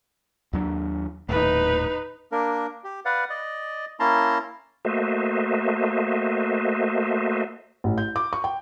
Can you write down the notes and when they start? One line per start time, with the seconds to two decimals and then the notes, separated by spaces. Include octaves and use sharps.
0.53 D#2 F#3 D4
1.29 D#1 D#2 A2 D#4 B4
2.32 A#3 D4 A#4
2.84 G4
3.05 B4 D5 F5 F#5
3.30 D5 D#5
4.00 A#3 C#4 E4 A5 A#5 C6
4.85 A3 A#3 F#4 C5 D#5 E5
7.84 A1
7.98 G6
8.16 D6
8.33 C#6
8.44 G5